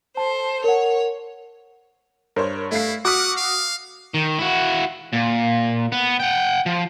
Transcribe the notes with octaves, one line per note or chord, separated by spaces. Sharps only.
A4 C5 A5
A#4 C#5 F#5
G2 A#4 C5 C#5
A3 E4 F5 C7
F#4 F#5 D6 D#6 F6 B6
F5
D#3
E4 F#4
A#2
B3
F#5 G5
F3